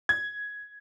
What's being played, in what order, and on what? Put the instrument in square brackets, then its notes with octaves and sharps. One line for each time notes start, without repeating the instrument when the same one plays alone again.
[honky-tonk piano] G#6